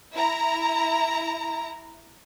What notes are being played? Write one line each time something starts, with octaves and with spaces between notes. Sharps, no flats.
E4 A#5